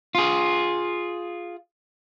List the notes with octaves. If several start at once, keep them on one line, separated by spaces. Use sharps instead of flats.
F4 G#4